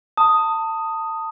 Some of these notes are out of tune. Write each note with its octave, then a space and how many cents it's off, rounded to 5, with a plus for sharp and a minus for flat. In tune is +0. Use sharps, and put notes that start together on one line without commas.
A5 +25 D#6 +0